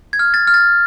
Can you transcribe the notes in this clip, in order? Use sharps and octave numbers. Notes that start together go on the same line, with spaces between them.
G#6
F6
A6
F6
A6